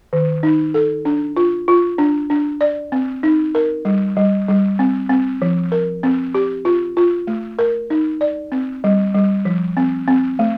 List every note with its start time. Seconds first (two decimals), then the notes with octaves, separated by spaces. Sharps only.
0.13 D#3
0.43 D#4
0.74 A4
1.05 D4
1.37 F4
1.68 F4
1.98 D4
2.30 D4
2.61 D5
2.92 C4
3.23 D#4
3.55 A#4
3.85 G3
4.16 G3
4.48 G3
4.79 C4
5.09 C4
5.42 F3
5.72 A#4
6.03 C4
6.35 G4
6.65 F4
6.97 F4
7.27 A3
7.59 A#4
7.90 D#4
8.21 D5
8.52 C4
8.84 G3
9.14 G3
9.45 F3
9.77 C4
10.08 C4
10.39 A3